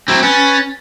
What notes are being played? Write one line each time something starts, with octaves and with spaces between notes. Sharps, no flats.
F#3 C4 E4
C#4 B4 A6